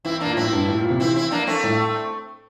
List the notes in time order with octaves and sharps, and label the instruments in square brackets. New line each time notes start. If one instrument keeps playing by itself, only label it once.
[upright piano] E3 [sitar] C4 E4
[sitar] A#3 D4
[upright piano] A#2
[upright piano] A2 [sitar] C4 E4
[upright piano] G2
A2
A#2
C3
[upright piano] E3 [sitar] C4 E4
[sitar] C4 E4
A#3 D4
A3 C4
[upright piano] A2